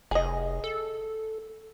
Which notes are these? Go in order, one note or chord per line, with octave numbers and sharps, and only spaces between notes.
F1 G#4 D#5
A4